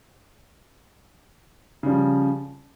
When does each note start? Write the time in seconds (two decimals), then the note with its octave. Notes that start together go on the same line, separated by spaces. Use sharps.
1.83 C#3
1.86 G3
1.89 F3